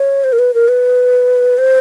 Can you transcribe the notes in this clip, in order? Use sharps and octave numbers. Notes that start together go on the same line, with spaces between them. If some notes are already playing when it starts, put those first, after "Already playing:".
Already playing: C#5
C5
A#4
B4
A#4
B4
C5